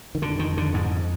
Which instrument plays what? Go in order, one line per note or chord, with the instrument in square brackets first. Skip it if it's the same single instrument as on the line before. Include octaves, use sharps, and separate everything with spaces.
[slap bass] D#3
[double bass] F2 [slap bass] D3
[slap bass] D#3
D3
G#2